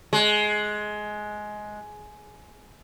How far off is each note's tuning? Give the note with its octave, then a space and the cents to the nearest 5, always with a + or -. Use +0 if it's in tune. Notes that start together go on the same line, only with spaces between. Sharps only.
G#3 +15